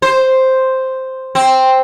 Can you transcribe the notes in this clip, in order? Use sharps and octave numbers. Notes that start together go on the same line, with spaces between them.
C5
C4